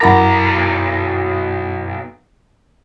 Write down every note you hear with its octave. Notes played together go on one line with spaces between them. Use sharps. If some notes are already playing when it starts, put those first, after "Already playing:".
B1 F#2 E4 A#4 F#5 A#5 B5 D6